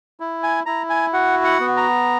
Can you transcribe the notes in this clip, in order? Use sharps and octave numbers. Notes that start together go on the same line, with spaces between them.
E4
G#5
E4 A#5
G#5
F#4 F#5
F#5
B3
A#5